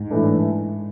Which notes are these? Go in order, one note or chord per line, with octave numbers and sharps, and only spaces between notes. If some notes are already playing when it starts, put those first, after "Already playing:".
Already playing: G#2
A2 E3 A3 D4